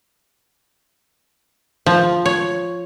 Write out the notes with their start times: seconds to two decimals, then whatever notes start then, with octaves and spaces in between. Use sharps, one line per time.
1.86 F3
2.26 C#5